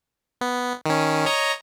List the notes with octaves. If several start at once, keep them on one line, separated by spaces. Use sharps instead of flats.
B3
D#3 C#4
C#5 D#5 A#5